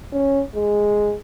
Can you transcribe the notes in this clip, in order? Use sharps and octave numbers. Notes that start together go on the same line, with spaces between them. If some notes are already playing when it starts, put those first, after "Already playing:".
C#4
G#3